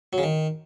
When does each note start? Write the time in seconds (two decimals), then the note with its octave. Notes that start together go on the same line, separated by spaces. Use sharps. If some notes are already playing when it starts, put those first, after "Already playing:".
0.13 F#3
0.18 C#3
0.23 D#3